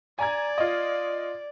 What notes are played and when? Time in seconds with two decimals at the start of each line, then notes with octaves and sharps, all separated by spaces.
0.19 D5 G#5 A#5 G#6
0.58 F4 D#5